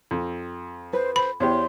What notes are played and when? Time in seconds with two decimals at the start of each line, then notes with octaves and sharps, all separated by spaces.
0.11 F2
0.93 B4 C5
1.16 C5 B5
1.40 E2 G4 C5 C#5 C6